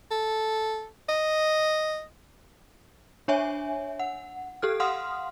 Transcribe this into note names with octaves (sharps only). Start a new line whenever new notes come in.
A4
D#5
D4 C#5 E5 G#5
F#5
G4 A4 F6
F5 F#5 C6 D#6 F6